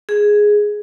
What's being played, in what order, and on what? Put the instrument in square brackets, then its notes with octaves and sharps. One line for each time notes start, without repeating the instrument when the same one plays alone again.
[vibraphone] G#4